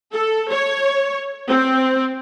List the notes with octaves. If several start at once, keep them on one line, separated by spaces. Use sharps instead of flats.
A4
C#5
C4